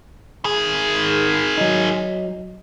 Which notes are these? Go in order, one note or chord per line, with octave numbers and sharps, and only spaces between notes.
D#3 G#4
F#3 D#4